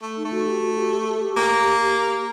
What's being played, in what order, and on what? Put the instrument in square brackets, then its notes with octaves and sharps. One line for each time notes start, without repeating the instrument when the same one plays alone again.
[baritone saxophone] A3
[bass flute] D#4
[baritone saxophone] A3
[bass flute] F#4
G4
F#4
G4
G4
A4
G4
[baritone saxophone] A#3